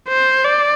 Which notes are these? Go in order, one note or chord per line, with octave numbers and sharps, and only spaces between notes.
C5
D5